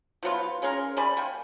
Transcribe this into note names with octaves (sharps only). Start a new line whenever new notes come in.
F3 F#3 B3 F4
G#3 C#4 G#4 A#4
G3 D5 G#5 B5
A#3 G5 G#5